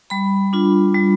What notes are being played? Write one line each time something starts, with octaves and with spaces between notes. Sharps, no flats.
G3 B5
D4 F4
G3